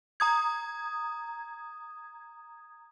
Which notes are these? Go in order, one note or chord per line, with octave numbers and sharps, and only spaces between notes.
A#5 D#6 G#6